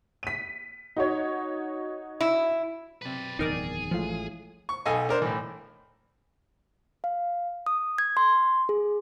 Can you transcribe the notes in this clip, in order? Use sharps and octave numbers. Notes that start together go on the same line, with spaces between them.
B6 D#7
D#4 F#4 C#5
E4
B1 C3 B4 D5
D1 E2 D#3 D#4 G#4 A#4 D5
A1 A2 F3 G#3 F4 F5
C#6
B1 A4 D#5 F5 G#5
D4 A#4 C5
A2 E3
F5
D#6
G#6
C6
G#4